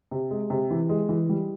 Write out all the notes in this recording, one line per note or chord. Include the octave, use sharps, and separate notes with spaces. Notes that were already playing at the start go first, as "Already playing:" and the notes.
C3
G#3
C3
E3
G#3
E3
G3